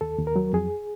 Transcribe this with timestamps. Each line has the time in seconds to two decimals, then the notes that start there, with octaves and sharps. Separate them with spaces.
0.01 D#2 A4
0.18 D#2
0.27 A#4
0.36 F#3
0.53 F2 G#4